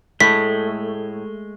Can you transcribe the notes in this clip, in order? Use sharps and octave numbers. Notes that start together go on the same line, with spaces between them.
A2 G#3 A3 B6